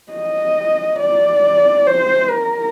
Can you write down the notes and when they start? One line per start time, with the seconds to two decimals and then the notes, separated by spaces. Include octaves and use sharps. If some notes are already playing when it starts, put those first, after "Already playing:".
0.12 D#5
1.00 D5
1.87 C5
2.30 A#4